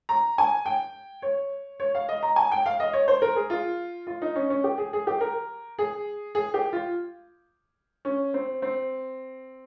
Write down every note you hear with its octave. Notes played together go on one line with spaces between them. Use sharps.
A#5
G#5
G5
C#5
C#5
F5
D#5
A#5
G#5
G5
F5
D#5
C#5
C5
A#4
G#4
F4
F4
D#4
C#4
C#4
G4
G#4
G#4
G4
A#4
G#4
G#4
G4
F4
C#4
C4
C4